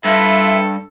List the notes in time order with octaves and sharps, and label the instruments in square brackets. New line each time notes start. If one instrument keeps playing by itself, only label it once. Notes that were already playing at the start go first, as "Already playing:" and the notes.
[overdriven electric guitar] G2 [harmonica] E4 F4 B4 [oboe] A4 [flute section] E5